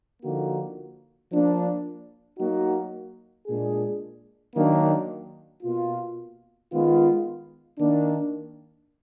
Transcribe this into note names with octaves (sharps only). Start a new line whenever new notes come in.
D3 F3 A#3 D#4 F#4
F3 A#3 D4
F#3 A#3 D#4 F#4
A#2 G#3 D4 G#4
D#3 F#3 A#3 D4
B2 A#3 F4
D#3 G#3 B3 F4
D#3 A#3 D4